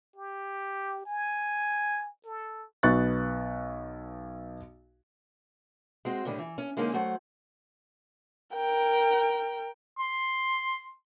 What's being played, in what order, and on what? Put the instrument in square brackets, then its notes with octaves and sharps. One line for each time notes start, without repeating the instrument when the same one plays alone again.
[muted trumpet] G4
G#5
A4
[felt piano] B1 B3 C#6 F#6 A6
[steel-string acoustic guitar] G#3 C4 F#4
A2 D3 D#3 G3
E3
C#4
D3 G#3 A#3 C#4 D#4 G#4
F#3 A3 C5 F#5
[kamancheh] A#4 G5
[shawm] C6